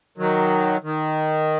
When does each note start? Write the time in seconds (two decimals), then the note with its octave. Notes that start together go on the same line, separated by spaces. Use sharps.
0.18 D#3 F#3
0.83 D#3